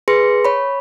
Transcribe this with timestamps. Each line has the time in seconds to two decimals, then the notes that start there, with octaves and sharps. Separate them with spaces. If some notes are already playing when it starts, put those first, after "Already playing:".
0.08 G#4 B4 C6 A#6 C#7
0.45 C#5 B5